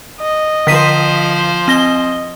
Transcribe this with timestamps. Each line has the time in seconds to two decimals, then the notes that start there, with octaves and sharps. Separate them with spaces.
0.21 D#5
0.67 D3 F3 C5 B6 D#7
1.68 C4 D#5 A#6 G7